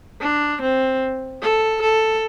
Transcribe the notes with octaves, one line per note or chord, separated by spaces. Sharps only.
D4
C4
A4
A4